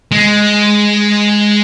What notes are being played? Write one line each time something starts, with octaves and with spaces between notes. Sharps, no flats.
G#3